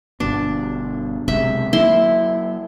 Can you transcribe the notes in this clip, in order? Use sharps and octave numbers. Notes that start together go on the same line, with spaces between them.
G1 G2 B2 D4
B1 C3 G#3 E5
F#3 A#3 E4 C6